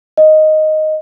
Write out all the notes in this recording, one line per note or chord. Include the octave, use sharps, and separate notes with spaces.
D#5